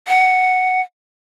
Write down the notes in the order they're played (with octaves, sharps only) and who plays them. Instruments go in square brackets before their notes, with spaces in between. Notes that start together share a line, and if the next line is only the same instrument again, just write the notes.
[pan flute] F#5